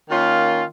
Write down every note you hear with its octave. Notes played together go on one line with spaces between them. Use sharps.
D#3 A#3 C#4 F4